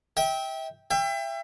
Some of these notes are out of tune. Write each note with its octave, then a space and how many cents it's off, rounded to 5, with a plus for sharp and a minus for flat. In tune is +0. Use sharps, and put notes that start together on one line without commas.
E5 -30 G5 +0
E5 +30 G5 +25